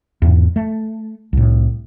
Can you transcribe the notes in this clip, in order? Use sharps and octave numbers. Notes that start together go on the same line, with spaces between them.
E2 G#2
A3
C2 A2